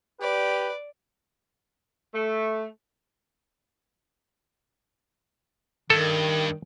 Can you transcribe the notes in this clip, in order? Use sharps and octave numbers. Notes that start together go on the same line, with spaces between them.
G4 B4 D5
A3
G2 D#3 A4